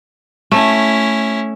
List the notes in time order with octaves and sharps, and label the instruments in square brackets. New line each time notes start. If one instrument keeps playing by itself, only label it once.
[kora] A3 [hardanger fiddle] C#4 E4